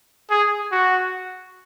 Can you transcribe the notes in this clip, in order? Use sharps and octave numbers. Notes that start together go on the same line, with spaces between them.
G#4
F#4